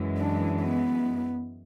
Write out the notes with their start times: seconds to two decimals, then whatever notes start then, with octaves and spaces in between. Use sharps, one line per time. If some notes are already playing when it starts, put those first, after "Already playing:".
Already playing: F#2 E3 G#3
0.18 D4
0.63 B3